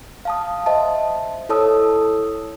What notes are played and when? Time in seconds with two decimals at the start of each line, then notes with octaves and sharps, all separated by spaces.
0.25 F5 A5 D#6
0.66 C5 D#5 E5 A5
1.49 E4 A4 C#5 A5 D#6 E6